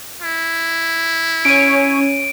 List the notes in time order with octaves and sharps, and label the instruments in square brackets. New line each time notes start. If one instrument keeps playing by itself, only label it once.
[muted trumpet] E4
[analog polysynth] C#4 C#5 [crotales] D7 D#7